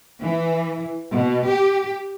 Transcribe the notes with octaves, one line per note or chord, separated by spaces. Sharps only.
E3
B2
G4